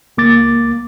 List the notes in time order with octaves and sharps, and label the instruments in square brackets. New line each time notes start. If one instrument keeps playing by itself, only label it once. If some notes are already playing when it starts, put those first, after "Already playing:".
[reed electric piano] C#2 A#3 D6 A6